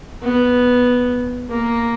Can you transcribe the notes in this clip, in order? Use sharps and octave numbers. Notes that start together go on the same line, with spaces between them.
B3
A#3